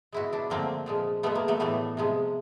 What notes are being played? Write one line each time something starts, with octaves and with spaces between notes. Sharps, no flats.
B2 G#3 E4 F#4
D4 E4
D3 F3 A3 A#3 C4
A#2 F3 G#3
B2 G#3 A3 B3
A#3
A3 B3
A2 E3 G3 A3 B3
C3 F3 G#3